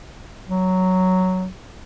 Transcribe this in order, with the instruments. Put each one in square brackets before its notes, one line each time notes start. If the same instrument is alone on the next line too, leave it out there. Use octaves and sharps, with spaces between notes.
[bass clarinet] F#3